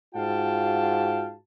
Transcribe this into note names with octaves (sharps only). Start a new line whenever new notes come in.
G#2 F4 F#4 F5 G5 A5